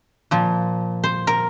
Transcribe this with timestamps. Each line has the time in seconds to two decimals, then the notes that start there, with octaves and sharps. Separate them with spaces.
0.31 A#2 F3
1.04 C5
1.27 A#4